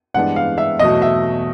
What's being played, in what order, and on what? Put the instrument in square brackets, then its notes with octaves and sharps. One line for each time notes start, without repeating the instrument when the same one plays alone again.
[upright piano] G2 E3 G#3 B3 D4 [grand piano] F#5
[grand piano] F5
E5
[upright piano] E2 B2 F#3 A3 [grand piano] D#5
[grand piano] E5